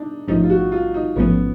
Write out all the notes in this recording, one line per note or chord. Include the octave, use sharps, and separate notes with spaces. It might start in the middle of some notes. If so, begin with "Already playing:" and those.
Already playing: D4 D#4
A1 G#2 F3 A3 C#4 D#4
F4
F#4
F4
D#4
A1 G#2 F3 A3 B3 C#4